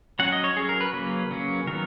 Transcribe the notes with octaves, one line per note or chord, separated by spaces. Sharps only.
F#3 C#4 F#5
D#5
C#5
F#3 C#4 G#4
A#4
B4
C#3 F#3 A#3 C#4 B4
C#3 F#3 A#3 C#4
D#3 F#3 B3 A#4